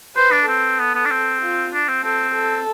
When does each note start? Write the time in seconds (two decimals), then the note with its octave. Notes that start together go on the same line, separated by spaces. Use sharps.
0.16 B4 C5
0.32 D4
0.48 C4 A4
0.79 B3
0.95 B3
1.05 D4
1.10 C4
1.42 F4
1.73 D4
1.88 C4
2.04 C4 A4
2.36 A4